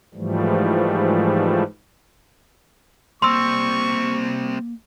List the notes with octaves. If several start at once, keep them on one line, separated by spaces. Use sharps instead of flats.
G#2 E3 F3 G3 A3
G3 A#3 C4 C6 C#6 E6